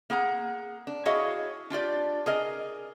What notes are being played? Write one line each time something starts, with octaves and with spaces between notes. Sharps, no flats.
A#3 G#4 F#5 A#5
D4
E4 F#4 G#4 C#5 D#5 F5
D4 F4 G4 D5
G#4 A#4 D#5